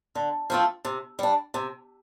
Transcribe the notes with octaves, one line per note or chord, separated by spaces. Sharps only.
D3
F3 A3 C4 F4
C3
G3 D4
C3